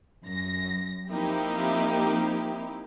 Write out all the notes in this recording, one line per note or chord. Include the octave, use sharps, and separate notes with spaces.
F#2 A#6
F3 A#3 C4 D#4 E4 G4